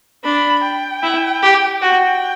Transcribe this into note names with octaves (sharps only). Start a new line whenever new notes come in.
D4 B5
G5
E4
G4
F#4 G5